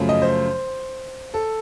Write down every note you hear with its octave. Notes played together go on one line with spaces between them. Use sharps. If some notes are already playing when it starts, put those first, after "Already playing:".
Already playing: F#2 C#3 F3 A3
D#5
C5
A4